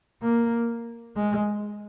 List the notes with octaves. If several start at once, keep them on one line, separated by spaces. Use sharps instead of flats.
A#3
G#3